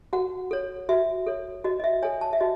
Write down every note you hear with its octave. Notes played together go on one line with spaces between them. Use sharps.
F#4 F#5
A4 C#5
F#4 E5
A4 C#5
F#4 D#5
D#5
E5
A4 C#5 G#5
A5
E5
F#4 D#5